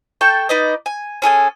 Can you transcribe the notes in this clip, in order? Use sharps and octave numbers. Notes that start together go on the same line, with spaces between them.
A4 G5 A5 C#6
D#4 B4 D5 D#5
G#5
C#4 G#4 A4 G#5